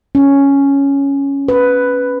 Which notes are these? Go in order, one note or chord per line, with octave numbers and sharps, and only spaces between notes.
C#4
B4